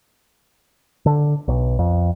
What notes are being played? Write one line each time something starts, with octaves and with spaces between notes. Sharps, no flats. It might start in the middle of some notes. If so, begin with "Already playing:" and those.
D3
B1
F2